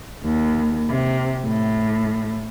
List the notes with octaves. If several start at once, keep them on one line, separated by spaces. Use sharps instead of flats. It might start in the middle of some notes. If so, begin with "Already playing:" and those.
D#2
C3
A2